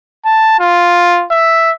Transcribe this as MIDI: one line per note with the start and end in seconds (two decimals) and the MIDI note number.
0.25 0.56 81
0.59 1.25 65
1.31 1.72 76